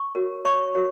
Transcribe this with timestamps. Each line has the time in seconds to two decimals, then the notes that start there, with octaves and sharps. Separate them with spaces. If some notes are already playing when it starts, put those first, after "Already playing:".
Already playing: C#6
0.15 F#4 A#4 C#5
0.45 C#5 C#6
0.75 F#4 A#4 C#5